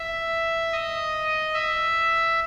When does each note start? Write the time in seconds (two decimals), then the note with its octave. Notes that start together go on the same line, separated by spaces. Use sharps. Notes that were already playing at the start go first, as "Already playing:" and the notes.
Already playing: E5
0.72 D#5
1.54 E5